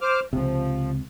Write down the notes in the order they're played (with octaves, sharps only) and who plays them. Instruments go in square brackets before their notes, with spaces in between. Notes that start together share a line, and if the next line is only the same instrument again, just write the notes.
[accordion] C5 D6 F6
[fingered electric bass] C#2 C3 [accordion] F3